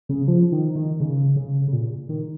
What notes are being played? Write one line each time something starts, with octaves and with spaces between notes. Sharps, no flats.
C#3
F3
D#3
D#3
C#3
C#3
C#3
A#2
D#3